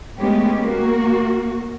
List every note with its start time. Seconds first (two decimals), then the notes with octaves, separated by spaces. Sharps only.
0.17 G#3 A3 B3 C#4 G4
0.58 A#3 F#4